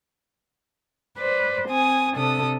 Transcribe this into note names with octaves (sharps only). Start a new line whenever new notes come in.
B4 C5 D5
C4 G#5 D#6
C3 D4 A4 D#6